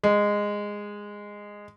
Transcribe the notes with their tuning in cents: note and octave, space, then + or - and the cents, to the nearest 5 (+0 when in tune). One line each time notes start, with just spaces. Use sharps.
G#3 -10